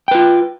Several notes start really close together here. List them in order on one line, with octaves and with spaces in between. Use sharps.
G5 B4 F4